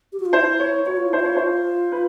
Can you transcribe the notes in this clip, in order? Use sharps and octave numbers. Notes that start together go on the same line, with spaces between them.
G4
F#4
F4
E4 C5
C#5
F#4 C#5
F4
E4 C5
F4
C#5
F4 C5
B4